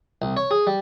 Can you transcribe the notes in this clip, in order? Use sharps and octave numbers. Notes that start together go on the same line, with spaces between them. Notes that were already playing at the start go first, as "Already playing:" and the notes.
C2
C#5
G#4
G3